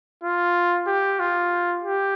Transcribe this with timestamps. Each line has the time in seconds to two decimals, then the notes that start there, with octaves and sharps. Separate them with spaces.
0.23 F4
0.87 G4
1.19 F4
1.83 G4